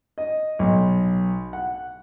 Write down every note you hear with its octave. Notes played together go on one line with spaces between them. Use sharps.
D#5
B1
F#5